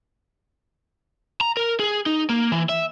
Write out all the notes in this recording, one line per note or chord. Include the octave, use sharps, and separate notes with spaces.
A#5
A#4
G#4
D#4
A#3
E3
E5